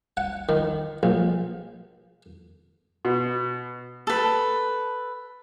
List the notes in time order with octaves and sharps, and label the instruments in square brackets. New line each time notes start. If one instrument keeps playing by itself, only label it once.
[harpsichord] F#5
D#3
A#1
[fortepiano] B2
[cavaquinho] A4 B4